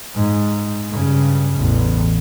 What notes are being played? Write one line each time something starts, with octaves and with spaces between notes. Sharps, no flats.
G#2
G2 C#3
A1 E2